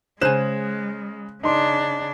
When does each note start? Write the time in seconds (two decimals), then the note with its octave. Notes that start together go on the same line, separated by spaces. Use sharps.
0.21 C#3 G#3 C5 G#5 F#6 E7
1.43 C#3 D4 D#4 C6